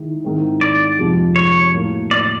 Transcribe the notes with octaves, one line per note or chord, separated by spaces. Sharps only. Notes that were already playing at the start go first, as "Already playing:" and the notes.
Already playing: D#3 G#3 E4
G#2 D#3 G#3 C4 E4
D5
F2 C3 F3 G#3
C#5
A2 F#3 A#3
D5